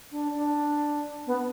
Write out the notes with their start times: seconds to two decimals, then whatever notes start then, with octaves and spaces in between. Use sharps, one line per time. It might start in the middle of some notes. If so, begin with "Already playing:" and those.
0.12 D4
0.34 D4
1.27 B3